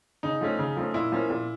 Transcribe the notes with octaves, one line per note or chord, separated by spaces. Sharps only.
C#3 D#4
F3 A3 C#4
C#3
F3 A3 C#4
A#2 E4
F3 A#3 C#4
A#2